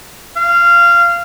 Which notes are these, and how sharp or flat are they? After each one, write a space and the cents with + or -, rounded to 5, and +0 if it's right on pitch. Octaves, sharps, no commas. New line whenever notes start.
F5 -15